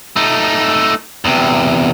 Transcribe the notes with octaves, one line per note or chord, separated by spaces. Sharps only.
A3 D#4
E2 C3